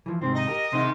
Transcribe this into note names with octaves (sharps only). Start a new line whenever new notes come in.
E3 F3
G#2 C3 D#3 C4
D#4 D#5
G4 A#4
G#2 C3 D#3 C6